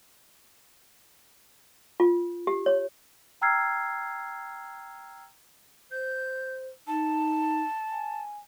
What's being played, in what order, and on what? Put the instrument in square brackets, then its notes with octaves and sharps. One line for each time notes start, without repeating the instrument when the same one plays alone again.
[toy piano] F4
G4
C#5
[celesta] G5 A#5 E6 F6 G#6 C7
[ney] C5 [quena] G6
[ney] D#4 [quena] A5
[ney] G#5